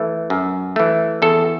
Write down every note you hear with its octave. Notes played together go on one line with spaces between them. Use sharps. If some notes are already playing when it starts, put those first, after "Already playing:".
Already playing: E3 A3
F#2
E3 A3
E2 A4